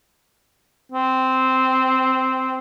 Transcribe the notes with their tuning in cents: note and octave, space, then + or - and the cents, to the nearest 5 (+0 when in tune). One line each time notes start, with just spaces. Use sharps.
C4 -5